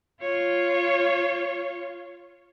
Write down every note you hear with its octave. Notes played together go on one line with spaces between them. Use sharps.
F4 C#5